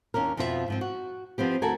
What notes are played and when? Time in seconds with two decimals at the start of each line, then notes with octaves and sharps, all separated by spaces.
0.14 D#2 C#4 D4 A#4
0.37 F2 B2 F3 F4 A#4 E5
0.68 G#2 F3 C4
0.81 F#4
1.38 F3 B3 C4 G4
1.62 D2 F#4 A4 A#4 G#5